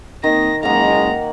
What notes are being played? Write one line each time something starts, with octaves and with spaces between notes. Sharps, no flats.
D#3 A#3 C4 D#4 A#6
F#1 G#3 A#3 F#5 A#5